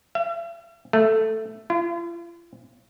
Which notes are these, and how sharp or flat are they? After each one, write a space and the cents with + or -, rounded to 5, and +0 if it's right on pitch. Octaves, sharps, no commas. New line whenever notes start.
E5 +45
A3 +5
F4 -40